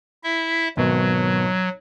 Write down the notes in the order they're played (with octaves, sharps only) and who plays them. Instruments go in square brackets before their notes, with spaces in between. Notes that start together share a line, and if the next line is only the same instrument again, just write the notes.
[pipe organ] E4 E5
[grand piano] G#1 B2 [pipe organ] F#3